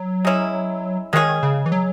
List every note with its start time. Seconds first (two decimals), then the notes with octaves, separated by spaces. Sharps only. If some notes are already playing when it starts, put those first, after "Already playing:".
Already playing: F#3
0.25 G#3 C#4 E4
1.13 D#3 G#3 C#4 G#4
1.43 C#3
1.66 E3
1.72 F#3